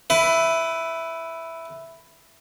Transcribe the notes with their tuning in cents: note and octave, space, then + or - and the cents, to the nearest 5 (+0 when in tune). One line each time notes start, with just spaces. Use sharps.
E4 +0 B4 +20